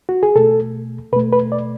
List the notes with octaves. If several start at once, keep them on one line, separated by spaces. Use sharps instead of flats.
F#4
G#4
B2 A3 A4
B2 A3 B4
B4
D5